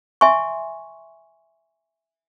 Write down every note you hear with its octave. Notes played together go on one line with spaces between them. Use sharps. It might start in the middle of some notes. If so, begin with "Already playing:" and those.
E5 G#5 C6 C#6